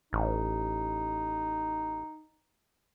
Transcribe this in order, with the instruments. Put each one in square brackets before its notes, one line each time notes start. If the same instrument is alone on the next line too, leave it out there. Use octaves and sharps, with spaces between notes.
[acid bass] A1 [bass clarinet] D#4